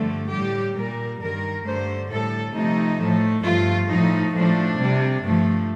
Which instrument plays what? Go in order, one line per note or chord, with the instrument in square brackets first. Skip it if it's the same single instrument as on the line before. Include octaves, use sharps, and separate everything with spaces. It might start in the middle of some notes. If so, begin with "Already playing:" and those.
Already playing: [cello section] G2 D3 F3 A3
A2 G3 G4
A#2 G3 A#4
G2 D#3 G3 A#4
G2 D3 A3 C5
A2 G3 A4
C3 F3 A3 D#4
A2 F3 A3
G2 F3 A3 F4
A2 F3 A3 D#4
A2 F3 A3 D4
C3 G3
G2 F3 A3